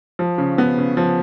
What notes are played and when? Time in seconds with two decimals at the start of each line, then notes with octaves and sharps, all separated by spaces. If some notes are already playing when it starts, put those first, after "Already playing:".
0.19 F3
0.38 C#3
0.58 B3
0.78 C#3
0.97 F3